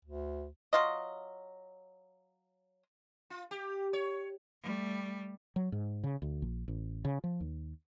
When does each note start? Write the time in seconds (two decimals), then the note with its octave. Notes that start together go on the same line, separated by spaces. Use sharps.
0.05 D2
0.73 F#3 F4 D#5
3.30 F4
3.51 G4
3.93 C#5
4.62 G3 A3
5.56 F#3
5.72 G#2
6.04 C#3
6.22 D2
6.42 A#1
6.68 A1
7.05 C#3
7.24 F3
7.40 D#2